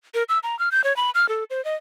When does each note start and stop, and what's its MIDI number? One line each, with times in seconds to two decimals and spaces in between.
0.14 0.23 70
0.29 0.39 88
0.43 0.58 82
0.59 0.69 89
0.72 0.84 91
0.84 0.95 73
0.97 1.10 83
1.15 1.28 89
1.29 1.44 69
1.50 1.63 72
1.65 1.75 75